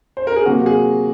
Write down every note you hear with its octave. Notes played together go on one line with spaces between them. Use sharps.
C5
A#4
G#4
C3 F#3 A#3 F#4
G#4